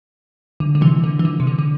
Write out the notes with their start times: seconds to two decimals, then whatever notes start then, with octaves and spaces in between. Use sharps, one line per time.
0.60 D3
0.75 D3
0.81 C3 E3
1.04 D3
1.19 E3
1.25 D3
1.40 C3
1.47 D3
1.59 D3